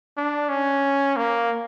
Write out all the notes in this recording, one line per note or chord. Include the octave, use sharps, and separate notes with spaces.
D4
C#4
A#3